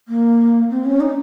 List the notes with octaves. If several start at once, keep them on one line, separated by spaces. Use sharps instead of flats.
A#3
C4
C#4
D#4